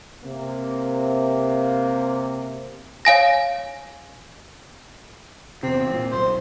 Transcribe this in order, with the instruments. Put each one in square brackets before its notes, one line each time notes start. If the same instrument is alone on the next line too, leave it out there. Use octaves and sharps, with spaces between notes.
[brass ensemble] C3 A#3
[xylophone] C#5 F5 G#5 A#6
[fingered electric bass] E2 C3 [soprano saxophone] C4
[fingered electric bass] A#2
[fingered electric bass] D#1 B1 [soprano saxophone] C5